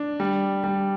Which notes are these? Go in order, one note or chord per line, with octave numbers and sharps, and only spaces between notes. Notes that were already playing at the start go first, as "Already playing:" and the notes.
Already playing: D4
G3
G3